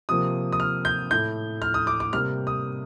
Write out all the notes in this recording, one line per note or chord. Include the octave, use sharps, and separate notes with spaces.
C3 F3 A#3 D#6
D#6
F6
G6
A2 A3 G6
F6
D#6
D6
D6
C3 G3 A#3 F6
D#6